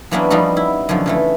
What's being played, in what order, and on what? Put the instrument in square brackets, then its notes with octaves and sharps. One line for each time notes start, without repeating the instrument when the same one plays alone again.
[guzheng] E3 F#3 A#3 B3 C#4 D4
F3 G3 B3 D#4 F#4
E4
F#2 D3 D#3 F3
C#3 E3 A3